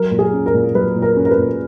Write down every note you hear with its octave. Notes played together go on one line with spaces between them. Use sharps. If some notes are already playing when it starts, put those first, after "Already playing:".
Already playing: F#3 A#4
A#2
G#4
C#4
A#4
A#2
F#3 B4
A#2
A#4
C#4
A#4
B4
A#2